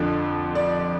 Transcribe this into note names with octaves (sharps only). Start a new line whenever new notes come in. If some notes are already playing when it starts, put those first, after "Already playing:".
Already playing: F2 D3 F3
D5